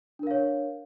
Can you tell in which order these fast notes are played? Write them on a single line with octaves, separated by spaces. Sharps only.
D4 A#4 F5 C#5